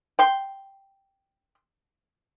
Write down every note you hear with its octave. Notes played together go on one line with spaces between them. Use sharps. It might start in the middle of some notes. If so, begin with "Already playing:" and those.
G5 C6